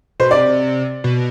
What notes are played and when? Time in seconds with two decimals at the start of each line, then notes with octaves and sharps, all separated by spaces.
0.20 B2 C5
0.31 C3 D5
1.04 B2